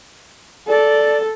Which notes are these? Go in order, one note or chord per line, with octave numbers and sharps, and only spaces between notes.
A4 D5